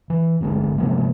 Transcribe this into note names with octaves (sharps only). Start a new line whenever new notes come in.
E3
D1 G1 D3 G#3
C3 F3 G#3 A#3